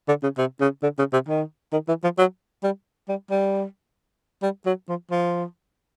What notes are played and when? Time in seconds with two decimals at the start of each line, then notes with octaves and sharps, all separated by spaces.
0.08 D3
0.23 C#3
0.38 C3
0.60 C#3
0.83 D3
0.99 C#3
1.13 C3
1.28 D#3
1.73 D#3
1.88 E3
2.03 F3
2.18 F#3
2.63 G3
3.08 G3
3.30 G3
4.42 G3
4.66 F#3
4.88 F3
5.11 F3